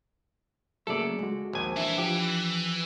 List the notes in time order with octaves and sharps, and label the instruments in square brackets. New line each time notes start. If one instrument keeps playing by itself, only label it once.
[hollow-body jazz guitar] C#3 F#3 A3 [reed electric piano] A#3 G#4 [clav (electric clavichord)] A4 D5
[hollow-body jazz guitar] C#2 [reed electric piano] G#3 F#4
[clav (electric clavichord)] A#1 G#5 [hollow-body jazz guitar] D#2
[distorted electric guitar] E3 [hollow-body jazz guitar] D4 E5
[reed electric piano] F3 [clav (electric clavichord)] G4